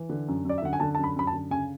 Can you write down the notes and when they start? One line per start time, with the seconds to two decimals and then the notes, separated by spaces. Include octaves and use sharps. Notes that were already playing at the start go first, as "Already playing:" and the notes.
Already playing: E3
0.09 D3
0.28 F#2
0.45 F#2 D5
0.58 E5
0.62 D3 F#5
0.73 G#5
0.80 D3 A5
0.95 F#2 A5
1.04 B5
1.16 F#2 B5
1.27 A5
1.33 D3
1.50 C#3 G#5